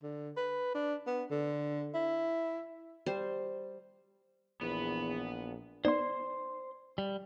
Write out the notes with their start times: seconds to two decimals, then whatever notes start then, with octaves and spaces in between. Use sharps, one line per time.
0.03 D3
0.37 B4
0.74 D4
1.07 B3
1.30 D3
1.94 E4
3.06 G3 C5
4.61 A#1 E2 B3 B4
5.85 B3 D#4 C5 D5 C6
6.98 G3